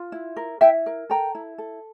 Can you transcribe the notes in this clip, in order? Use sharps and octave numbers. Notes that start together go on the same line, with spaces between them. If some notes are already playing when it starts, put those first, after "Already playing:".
Already playing: F4
E4
A#4
E4 E5 G5
A#4
A4 G5 A#5
E4
A4